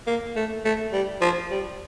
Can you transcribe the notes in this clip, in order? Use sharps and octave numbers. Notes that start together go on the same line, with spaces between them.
A#3
A3
A3
G3
F3
G3